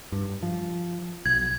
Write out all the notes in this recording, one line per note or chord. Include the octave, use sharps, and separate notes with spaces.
G2
F3
B1 G#6